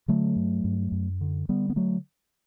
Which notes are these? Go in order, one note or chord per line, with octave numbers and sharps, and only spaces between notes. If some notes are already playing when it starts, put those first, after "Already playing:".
D3 F#3 A3
G2
G2
F#2
D3
D3 G3 B3
B3
F#3 A3